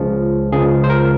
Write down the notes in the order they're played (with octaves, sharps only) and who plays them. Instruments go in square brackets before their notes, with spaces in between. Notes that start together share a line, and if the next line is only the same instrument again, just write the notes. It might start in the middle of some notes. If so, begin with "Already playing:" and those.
Already playing: [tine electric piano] C#2 C#3 F3
C#2 C#3 F3 G#4
C5
A#4